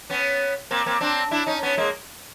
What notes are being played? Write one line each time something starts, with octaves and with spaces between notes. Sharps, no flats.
B3 C#4
A#3 C4
A#3 C4
C4 D4
D4 E4
C#4 D#4
B3 C#4
G#3 A#3